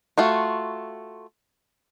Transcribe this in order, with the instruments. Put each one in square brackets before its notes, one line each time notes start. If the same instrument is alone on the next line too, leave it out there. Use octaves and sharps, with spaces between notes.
[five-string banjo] A3 F4 F#4